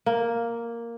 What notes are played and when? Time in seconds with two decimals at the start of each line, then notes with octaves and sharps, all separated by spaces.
0.06 A#3